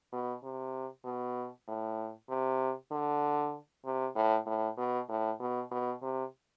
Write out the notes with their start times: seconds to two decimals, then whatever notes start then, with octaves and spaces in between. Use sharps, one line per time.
0.13 B2
0.43 C3
1.05 B2
1.68 A2
2.29 C3
2.91 D3
3.85 C3
4.16 A2
4.46 A2
4.78 B2
5.09 A2
5.40 B2
5.71 B2
6.02 C3